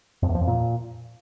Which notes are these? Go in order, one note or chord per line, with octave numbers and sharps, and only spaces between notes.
F2
E2
F3
F2
A#2